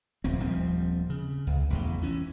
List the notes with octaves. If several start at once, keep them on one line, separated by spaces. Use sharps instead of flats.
D1 A#1 C4
D#1 F3 G3 C4
C#3
C#2
A1 E2 B2
E3 C#4